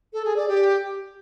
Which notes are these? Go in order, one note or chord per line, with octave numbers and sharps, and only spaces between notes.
A4
G#4
D5
G4